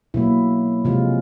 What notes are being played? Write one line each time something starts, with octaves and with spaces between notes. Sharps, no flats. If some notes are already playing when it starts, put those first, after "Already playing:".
B2 F#3 A#3 E4
C3 F3 G#3 F4